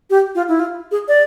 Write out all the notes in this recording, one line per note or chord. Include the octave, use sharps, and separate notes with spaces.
G4
F4
E4
F4
G#4
D5